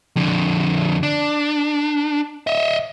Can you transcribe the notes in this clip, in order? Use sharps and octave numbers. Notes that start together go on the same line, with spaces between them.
F2 D3
D4
D#5 E5